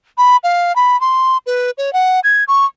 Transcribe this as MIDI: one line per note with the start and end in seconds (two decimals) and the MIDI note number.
0.18 0.37 83
0.43 0.75 77
0.76 0.99 83
1.01 1.38 84
1.46 1.71 71
1.78 1.93 73
1.93 2.20 78
2.24 2.44 92
2.48 2.65 85